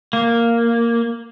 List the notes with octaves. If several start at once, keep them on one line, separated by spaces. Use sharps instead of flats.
A#3